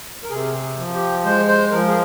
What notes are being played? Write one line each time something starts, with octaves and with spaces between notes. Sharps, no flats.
A#4
C3 G#4
F3
G4
G#3 C5
C5
F3 A#4
G#4